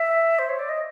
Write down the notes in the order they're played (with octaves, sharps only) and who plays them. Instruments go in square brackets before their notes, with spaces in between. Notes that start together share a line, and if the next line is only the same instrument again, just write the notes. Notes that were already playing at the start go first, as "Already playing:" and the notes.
Already playing: [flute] E5
C5
C#5
D5
D#5